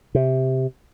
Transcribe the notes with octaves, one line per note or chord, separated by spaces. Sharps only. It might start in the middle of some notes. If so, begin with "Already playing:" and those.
C3